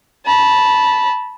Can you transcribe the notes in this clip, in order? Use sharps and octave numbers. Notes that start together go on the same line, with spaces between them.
A5 B5